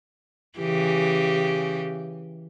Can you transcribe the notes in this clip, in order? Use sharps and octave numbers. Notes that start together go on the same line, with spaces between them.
C#3 E3 G4